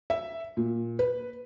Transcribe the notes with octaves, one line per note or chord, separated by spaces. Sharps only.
E5
A#2
B4